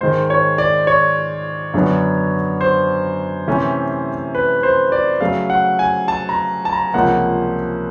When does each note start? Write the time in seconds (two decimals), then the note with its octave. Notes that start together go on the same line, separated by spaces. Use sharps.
0.01 G#2 D#3 G#3 C5
0.30 C#5
0.58 D5
0.87 C#5
1.74 F#2 D3 F#3 B3 D4
2.61 C5
3.48 C3 E3 A3 C#4
4.35 B4
4.63 C5
4.92 D5
5.20 C#3 F#3 A3 F5
5.50 F#5
5.79 G#5
6.08 A5
6.29 A#5
6.65 A5
6.73 A#5
6.94 C#2 C3 F3 A#3 C#4 F#5